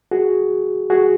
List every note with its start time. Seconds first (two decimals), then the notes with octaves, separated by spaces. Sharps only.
0.11 F#4 G#4
0.90 F#4 G#4